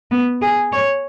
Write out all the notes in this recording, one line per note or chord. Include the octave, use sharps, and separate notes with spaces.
B3
G#4
C#5